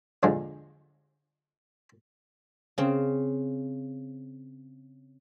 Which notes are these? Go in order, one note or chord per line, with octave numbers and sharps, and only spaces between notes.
A#1 E2 G2 D3 F3 G#3
C#3 C4